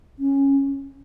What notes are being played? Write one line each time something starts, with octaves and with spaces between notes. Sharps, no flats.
C#4